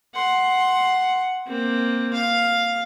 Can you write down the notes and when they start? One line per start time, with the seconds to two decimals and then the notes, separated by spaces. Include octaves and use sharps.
0.15 F#5 C6
1.47 A#3 C4
2.13 F5